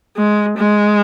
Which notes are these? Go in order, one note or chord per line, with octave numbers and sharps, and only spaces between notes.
G#3
G#3